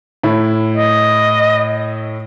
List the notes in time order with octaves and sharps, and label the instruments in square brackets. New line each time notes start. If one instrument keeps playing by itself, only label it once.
[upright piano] A2 E4
[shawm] D#5